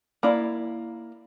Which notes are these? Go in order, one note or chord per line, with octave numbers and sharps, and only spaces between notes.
A#3 E4 D5